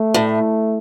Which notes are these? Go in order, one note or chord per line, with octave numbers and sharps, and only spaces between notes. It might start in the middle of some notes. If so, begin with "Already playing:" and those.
Already playing: A3
A2